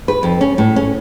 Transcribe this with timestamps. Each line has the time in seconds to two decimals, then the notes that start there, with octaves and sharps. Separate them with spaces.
0.08 B4
0.23 F2
0.41 C#4
0.58 A2
0.76 C#4